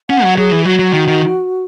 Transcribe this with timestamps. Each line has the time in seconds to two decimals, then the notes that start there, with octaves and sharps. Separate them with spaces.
0.10 C#4 F#5
0.23 F#3
0.37 F#3 G#4
0.52 E3
0.65 F#3 F#4
0.79 F#3
0.93 D#3
1.08 D#3